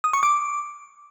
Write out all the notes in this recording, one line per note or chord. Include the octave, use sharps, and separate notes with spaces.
D#6
C#6
D6